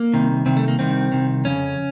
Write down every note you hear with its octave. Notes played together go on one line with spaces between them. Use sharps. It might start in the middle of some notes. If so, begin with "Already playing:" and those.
Already playing: A#3
C2 C3 D#3
C2 C3 D#3 C4
A3
A#3
C2 C3 D#3 C4
C2 C3 D#3
F2 C#3 C#4